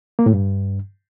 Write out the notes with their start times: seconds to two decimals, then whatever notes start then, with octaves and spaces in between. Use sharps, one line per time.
0.19 A#3
0.26 A2
0.34 G2